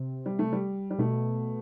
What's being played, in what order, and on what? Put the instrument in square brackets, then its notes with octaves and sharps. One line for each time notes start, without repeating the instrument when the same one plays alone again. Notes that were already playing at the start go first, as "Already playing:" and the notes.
Already playing: [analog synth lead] C3
[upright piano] G3
A3
G3
G3
[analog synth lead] B2 [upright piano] A3